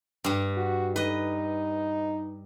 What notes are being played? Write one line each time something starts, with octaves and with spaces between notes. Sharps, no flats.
G2 G3
F#4
D#4 B4 D#5